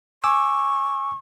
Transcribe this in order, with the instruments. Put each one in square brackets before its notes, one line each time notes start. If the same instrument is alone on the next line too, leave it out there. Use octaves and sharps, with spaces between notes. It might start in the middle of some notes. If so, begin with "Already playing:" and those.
[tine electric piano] G#5 D6 E6 [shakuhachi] C#6